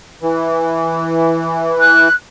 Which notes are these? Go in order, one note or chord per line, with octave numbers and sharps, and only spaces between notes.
E3
F#6